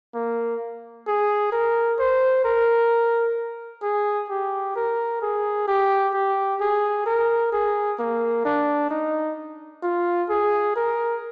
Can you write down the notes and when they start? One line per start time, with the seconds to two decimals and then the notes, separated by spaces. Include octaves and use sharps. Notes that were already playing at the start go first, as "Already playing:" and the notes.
0.14 A#3
1.07 G#4
1.52 A#4
1.99 C5
2.45 A#4
3.83 G#4
4.30 G4
4.76 A#4
5.22 G#4
5.67 G4
6.14 G4
6.60 G#4
7.06 A#4
7.52 G#4
7.99 A#3
8.45 D4
8.90 D#4
9.83 F4
10.29 G#4
10.76 A#4